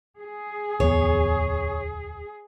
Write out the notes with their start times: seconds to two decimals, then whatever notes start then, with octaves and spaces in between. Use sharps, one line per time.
0.18 G#4
0.80 D1 E2 B3 C#5